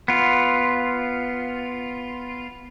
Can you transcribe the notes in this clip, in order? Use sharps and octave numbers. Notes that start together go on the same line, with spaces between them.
B3 F4